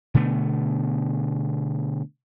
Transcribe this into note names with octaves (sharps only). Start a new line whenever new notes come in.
B2 D3 A3 B3